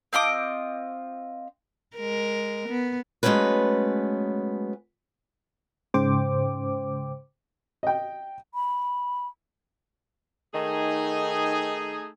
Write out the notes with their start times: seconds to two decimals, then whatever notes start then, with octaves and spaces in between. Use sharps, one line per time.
0.13 C4 F4 D#5 D6
1.97 G#3 A#4
2.69 B3
3.23 F#3 G#3 A3 B3 C#4 B4
5.94 G#2 C#3 C5 G5 D6
7.83 D#5 G5
8.54 B5
10.54 D#3 A3 D#4 G#4